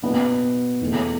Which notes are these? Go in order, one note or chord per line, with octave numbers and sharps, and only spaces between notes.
B2 B3 D4
E2 B2 A3